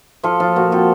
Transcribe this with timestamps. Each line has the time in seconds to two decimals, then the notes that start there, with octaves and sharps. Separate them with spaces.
0.23 F3 F4 A4
0.40 F3 F4
0.56 A#2 F#4
0.72 C4 F4 A4